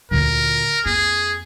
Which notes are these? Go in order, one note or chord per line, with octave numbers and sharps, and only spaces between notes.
D2 A#2 A#4
F2 A#3 G#4